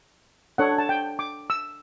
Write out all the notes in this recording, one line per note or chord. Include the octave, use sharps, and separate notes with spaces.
D4 A4 C#5 F#5
A5
G5
D6
E6